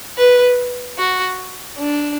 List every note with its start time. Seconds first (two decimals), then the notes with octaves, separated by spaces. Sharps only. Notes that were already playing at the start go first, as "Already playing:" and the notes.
0.17 B4
0.98 F#4
1.79 D4